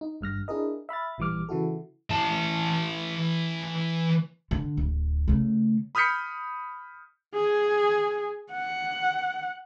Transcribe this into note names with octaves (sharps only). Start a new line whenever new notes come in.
D#4
G#1 G2 F6 A#6
D4 E4 G#4 A#4 D#5
E5 B5 F6 A6
A1 A#2 E3 G3 D6 F6
C#3 E3 E4 F#4 A4
E3 A5
D3
D1
C#3 A3
B5 D#6 F6 G6 B6 C#7
G#4
F#5